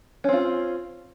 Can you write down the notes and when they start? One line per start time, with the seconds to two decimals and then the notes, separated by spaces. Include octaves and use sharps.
0.24 C#4
0.29 C4
0.33 F4